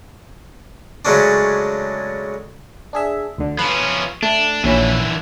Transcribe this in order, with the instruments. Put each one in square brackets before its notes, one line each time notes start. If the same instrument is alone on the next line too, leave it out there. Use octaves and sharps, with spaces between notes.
[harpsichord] C#3 F#3 G#3 A3 C#4 D4
[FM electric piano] D4 G#4 E5
D2 D3
[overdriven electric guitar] F3 C#4 [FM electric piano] B4
[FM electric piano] A3 [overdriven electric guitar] D4
[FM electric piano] A#1 C#4 B5 [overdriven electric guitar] D3 E3